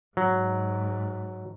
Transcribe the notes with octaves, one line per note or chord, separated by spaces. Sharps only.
G#2 F#3